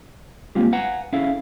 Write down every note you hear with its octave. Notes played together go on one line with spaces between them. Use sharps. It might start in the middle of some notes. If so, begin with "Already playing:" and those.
G#3 A#3 C4 F4 G4
B4 F5 F#5 G#5 A#5
C#4 E4 G#4 A4 F5